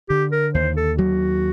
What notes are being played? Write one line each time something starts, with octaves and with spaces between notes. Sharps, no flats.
D3 G4
A#4
D#2 C5
A4
F#3 F#4